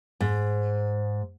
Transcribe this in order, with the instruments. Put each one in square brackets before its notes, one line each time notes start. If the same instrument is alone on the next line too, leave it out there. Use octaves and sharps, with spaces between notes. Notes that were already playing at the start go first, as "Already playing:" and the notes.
[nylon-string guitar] G#2